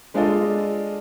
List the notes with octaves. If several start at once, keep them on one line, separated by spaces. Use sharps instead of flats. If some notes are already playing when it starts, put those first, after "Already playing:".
G#3 D4 F4 A4 D#5